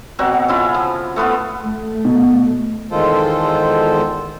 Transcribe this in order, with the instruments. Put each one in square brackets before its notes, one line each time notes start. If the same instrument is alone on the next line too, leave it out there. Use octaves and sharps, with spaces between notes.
[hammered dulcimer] B2 F#3 C4 F#5
C#3 E4 F4
F3
A3 B3 E4 F4
[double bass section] A3
[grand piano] B2
[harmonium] E2 D#3 G#3 F4 A4 C5